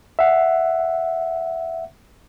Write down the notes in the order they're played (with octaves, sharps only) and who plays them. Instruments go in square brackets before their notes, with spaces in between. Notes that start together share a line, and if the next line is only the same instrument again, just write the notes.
[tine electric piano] E5 F#5